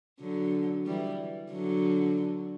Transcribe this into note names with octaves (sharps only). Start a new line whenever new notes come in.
D3 F#3
E3 G3
D3 F#3